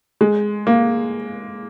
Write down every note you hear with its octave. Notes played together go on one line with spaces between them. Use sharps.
G#3
A#3